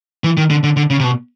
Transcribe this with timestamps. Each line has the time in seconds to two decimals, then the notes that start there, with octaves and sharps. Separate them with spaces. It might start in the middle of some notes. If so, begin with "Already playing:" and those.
0.24 E3
0.37 D#3
0.50 D3
0.63 D3
0.76 D3
0.90 C#3
1.00 C3
1.04 B2